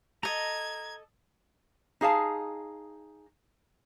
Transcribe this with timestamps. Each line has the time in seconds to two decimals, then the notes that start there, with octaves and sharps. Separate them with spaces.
0.23 A4 D#5 A#5 G#6
2.01 D#4 G#4 F5 A5